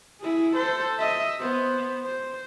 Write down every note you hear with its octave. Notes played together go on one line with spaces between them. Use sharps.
E4 G#4
A4 C5
D#5 E5
B3 C5
C5